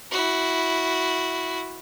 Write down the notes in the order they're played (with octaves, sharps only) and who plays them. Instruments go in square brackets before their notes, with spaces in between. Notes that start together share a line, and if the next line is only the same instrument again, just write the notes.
[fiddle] E4 F#4